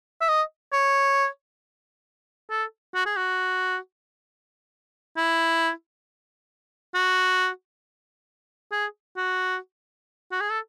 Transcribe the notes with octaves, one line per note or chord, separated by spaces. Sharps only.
E5
D#5
C#5
A4
F#4
G#4
F#4
E4
F#4
G#4
F#4
F#4
G#4
A4